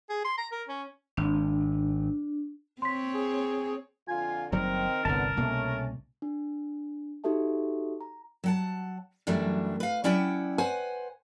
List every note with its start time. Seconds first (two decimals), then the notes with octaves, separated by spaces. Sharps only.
0.09 G#4
0.24 C6
0.38 A#5
0.52 A#4
0.68 C#4
1.17 G#1 D4
2.82 C4 C#5 C6 B6
3.14 G#4
4.08 F2 D3 F4 G#5
4.52 F#1 D#3 F#3 G3 C4 A#4
5.05 G1 C2 D3 B3 A#4 A5
5.37 C2 B2 A3 A#3 C#4
6.22 D4
7.24 D#4 F#4 G4 A4 E5 A5
8.01 A#5
8.44 F#3 F#5 A5
9.27 F#2 E3 F#3 G3 A3 D4
9.80 B4 F5
10.04 F#3 C#4 E4 D5 F#5 G5
10.58 B4 C5 F#5 G#5